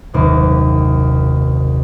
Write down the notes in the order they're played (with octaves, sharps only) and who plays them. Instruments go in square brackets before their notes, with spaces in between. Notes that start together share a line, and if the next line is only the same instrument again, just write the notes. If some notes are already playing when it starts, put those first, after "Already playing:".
[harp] F#1 D#2 C3